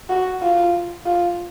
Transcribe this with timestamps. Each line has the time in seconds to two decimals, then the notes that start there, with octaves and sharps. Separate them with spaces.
0.09 F#4
0.42 F4
1.05 F4